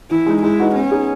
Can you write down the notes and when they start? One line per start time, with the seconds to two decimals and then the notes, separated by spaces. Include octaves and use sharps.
0.11 E3 E4
0.26 G#3 D#4
0.43 G#3 E4
0.59 D#4 F#4 B4 D#5
0.75 B3 C#4
0.91 D#4 G#4